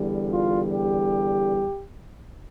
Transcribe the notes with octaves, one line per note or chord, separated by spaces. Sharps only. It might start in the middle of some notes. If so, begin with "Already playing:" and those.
Already playing: E2 D3 G3
F4
G4